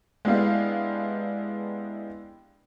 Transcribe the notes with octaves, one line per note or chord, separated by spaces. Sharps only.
G#3 B3 D4 E4 G4 F5